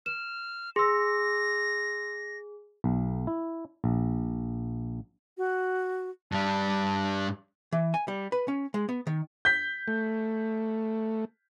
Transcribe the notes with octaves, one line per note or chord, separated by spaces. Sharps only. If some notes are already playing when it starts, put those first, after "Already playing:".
F6 E7
G#4 C6 E6 A#6
B1
E4
A#1
F#4
G2 G3 A5
E3
G#5
G3
B4
C#4
G#3
B3
D#3
G6 B6
A3